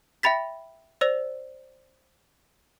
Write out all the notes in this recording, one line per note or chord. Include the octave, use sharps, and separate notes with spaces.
E5 G5 B5 A6 B6
C5 D5 E6 A#6 F7